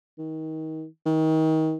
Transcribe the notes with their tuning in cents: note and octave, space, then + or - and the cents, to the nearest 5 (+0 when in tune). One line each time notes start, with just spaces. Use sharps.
D#3 +30
D#3 +30